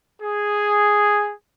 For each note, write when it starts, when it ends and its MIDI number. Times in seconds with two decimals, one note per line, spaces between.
0.21 1.33 68